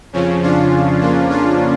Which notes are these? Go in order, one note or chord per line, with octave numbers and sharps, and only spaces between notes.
F2 C#3 F3 C#4
D4 F4
A#3 D4
D4 F4